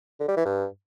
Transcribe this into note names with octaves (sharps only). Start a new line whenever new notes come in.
D3
G3
E3
G2